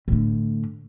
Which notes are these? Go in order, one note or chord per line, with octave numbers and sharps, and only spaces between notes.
A2 D3